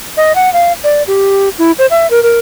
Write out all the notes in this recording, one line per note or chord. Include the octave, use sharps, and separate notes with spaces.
D#5
F#5
F5
D5
G4
E4
C5
E5
A#4
A#4